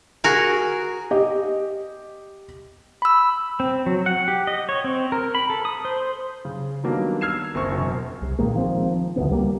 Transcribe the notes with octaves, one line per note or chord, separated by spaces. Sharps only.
F#4 G#4 A#4 G#5
G4 D#5
B5 E6
C4
F#3
F#5
G4
D#5
C#5
C4
A#4
B5
A4
D#6
C5
C#3
D#3 F#3 G3 A#3 B3 D4
E6 F6 G#6 C7 E7
F#1 C4 C#6
E1 F#2
C2
A#2 D#3 G#3 A#3
D#3 F3 C4
D2 D#3 B3
C#2 G3 A#3